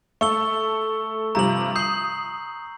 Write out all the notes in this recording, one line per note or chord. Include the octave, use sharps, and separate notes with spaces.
A3 A4 C#6 E6 G7
G2 C3 F3 A#5 F#7
D#6 G6 C7 F#7